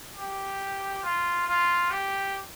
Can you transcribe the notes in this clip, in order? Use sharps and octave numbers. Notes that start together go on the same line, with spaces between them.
G4
F4
F4
G4